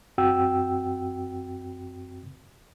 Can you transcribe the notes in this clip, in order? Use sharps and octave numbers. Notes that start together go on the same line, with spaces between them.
F#2 C4 F#4 G5 E6